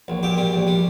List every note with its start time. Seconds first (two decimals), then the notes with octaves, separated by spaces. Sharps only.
0.08 A#1
0.23 A#2 G4
0.37 G3
0.53 A#1
0.67 G3